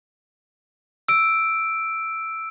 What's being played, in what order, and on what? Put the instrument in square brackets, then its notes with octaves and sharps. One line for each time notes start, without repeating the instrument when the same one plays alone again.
[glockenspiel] E6 D7